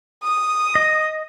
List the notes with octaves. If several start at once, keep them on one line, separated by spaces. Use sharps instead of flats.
D#6
D#5